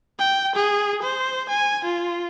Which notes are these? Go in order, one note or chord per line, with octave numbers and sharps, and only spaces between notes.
G5
G#4
C5
G#5
F4